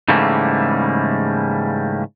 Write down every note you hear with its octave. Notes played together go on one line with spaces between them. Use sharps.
G#2 C#3 E3 G3 A3 A#3